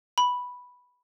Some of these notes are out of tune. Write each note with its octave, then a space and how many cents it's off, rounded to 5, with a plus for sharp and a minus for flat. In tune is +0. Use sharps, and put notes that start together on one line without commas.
B5 -5